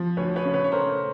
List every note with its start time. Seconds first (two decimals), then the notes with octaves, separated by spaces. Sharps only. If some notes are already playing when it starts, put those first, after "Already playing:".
Already playing: F3
0.17 D2 B4 C#5
0.36 B4 C#5
0.45 C#3
0.54 B4 C#5
0.64 C#5
0.72 A3 A#4 C5